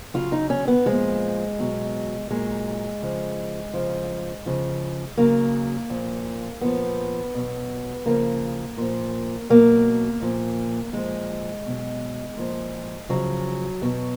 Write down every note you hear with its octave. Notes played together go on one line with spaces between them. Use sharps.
C#3 F#3 F4
D#4
C#4
B3
A#2 F3 G#3
B2 F#3
A#2 F#3 G#3
C#3 F3
C#3 F3
C#3 F3
C#3 F#3 A#3
A#2 F3
A#2 F3 B3
B2 F#3
C#3 F3 A#3
A#2 F3
B2 F#3 A#3
A#2 F3
A#2 F3 G#3
B2 F#3
A#2 F3
C#3 F3 F#3
B2 F#3